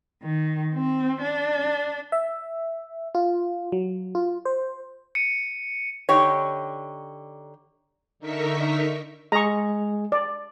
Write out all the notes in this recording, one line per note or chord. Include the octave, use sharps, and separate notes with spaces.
D#3
C4
D4
E5
F4
F#3
F4
C5
C#7 D#7
D3 D#4 G4 C#5
D3 D#4 A#4 E5 C#6 B6
G#3 G#4 A#5 C#6
D5